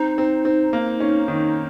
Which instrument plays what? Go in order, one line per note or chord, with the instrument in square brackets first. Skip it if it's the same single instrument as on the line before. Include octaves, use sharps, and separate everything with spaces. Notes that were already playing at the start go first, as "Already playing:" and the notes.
Already playing: [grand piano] C4 [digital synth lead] D#4
[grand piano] C4
C4
A#3
C#4
D#3